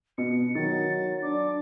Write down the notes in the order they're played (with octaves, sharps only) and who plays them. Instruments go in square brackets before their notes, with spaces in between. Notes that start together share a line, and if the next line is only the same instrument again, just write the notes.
[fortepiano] B2 [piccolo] C#7
[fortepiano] D#3 [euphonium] F#3 [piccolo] A6
[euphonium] D4 [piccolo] D6